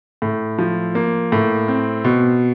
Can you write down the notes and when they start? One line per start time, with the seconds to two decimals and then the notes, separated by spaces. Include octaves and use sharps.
0.22 A2
0.58 F3
0.95 A#3
1.32 A2
1.68 C4
2.05 B2